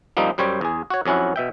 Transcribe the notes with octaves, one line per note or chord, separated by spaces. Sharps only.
F3 G3 A#3 C4 D#4
F#2 G3 C5 C#5 G5
E2 G#4
F#4 C#5
F2 F#3 C#4 E4 F#5
B2 E5 G5